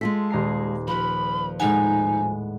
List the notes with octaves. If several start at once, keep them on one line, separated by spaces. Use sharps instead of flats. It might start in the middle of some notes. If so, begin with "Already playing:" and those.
G#3 F4 A4 B6
D#1 A#5 C7
F3 A#4 B4 B5
A2 G#3 D#4 F#5 G#5